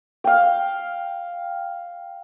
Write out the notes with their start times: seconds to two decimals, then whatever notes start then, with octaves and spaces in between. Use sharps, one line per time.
0.24 F5 G5